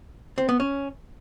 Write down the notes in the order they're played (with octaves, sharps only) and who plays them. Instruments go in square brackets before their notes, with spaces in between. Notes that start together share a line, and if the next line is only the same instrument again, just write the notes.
[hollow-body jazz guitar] C4
B3
C#4